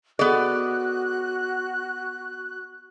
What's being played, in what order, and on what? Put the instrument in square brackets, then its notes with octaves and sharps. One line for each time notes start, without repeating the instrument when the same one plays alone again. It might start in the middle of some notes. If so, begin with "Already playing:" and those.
[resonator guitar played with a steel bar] B3 D5 [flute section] F#4 F#6 [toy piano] G#4 A4 D#5